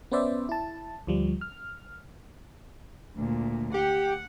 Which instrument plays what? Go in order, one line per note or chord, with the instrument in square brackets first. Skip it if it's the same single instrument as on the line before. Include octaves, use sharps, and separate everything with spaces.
[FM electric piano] B3 C#4 B4 C5 D5 E5
E4 A5
D2 F3 G3
F6
[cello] D2 A#2
[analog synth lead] G4 [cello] F#5